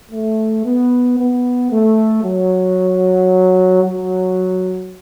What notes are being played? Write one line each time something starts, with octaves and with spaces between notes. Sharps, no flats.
A3
B3
B3
A3
F#3
F#3